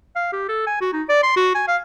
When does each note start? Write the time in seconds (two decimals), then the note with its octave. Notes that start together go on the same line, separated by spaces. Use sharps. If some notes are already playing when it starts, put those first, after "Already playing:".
0.16 F5
0.33 G4
0.49 A4
0.67 G#5
0.81 F#4
0.93 D#4
1.09 D5
1.23 C6
1.36 F#4
1.55 G#5
1.68 F5